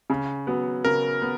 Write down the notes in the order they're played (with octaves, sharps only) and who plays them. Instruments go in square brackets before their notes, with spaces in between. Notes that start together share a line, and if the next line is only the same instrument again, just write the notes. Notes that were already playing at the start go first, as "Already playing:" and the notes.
[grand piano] C#3
F#3 B3
[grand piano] C#3 [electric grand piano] A#4
[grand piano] B3